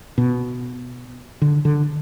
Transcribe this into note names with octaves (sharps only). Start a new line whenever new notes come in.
B2
D3
D3